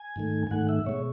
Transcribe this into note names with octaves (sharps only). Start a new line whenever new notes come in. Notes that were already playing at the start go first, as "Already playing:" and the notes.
Already playing: G#5
G#2 D#3 A3
G#5
G#2 D#3 A3 F#5
E5
B2 G#3 C#5